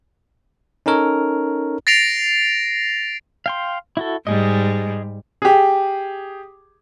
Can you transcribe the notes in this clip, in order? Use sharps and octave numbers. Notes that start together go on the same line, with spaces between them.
C#4 D#4 A4 A#4 C#5
A6 A#6 C7 D7 F7
F5 G5 C6
E4 F#4 A4
G#2 G3 G#4 D#5
G4 G#4